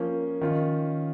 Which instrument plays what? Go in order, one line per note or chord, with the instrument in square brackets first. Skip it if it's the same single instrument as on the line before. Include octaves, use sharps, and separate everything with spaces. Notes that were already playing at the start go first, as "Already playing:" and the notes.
Already playing: [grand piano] F3 A#3 C#4
D#3 C#4 F4